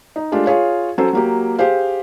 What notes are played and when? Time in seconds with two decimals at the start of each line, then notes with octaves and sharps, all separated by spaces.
0.16 D#4
0.32 G#3 A3 D4 F4 G4
0.46 F4 G#4 C#5 F5
0.98 F#3 C#4 A4 C5
1.13 F#3 A#3 G4
1.59 G4 G#4 C5 F5